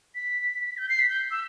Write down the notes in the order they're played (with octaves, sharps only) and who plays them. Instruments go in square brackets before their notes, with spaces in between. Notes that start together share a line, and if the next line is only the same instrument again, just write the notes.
[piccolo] B6
G6
C7
B6
G6
E6